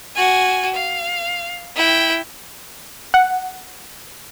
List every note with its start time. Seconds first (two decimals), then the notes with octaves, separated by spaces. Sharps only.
0.16 F#4 G#5
0.74 F5
1.76 E4 G5
3.14 F#5